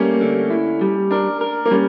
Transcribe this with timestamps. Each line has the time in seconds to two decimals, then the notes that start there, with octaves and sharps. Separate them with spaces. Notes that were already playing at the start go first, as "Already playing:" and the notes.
Already playing: G3 A3 A#3 C#4
0.21 D3
0.50 E4
0.81 G3
1.11 D4 A#4
1.41 A#4
1.66 A#3
1.71 G3 C#4